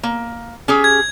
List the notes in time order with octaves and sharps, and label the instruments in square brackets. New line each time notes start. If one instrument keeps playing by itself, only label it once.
[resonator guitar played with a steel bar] A#3
C#4 G4 G#4
[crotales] G#6